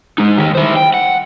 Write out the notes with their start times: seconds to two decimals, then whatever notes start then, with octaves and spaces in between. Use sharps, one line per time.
0.18 G#3 D#4
0.38 D#3 G4
0.55 E4 C5
0.77 G5
0.94 F#5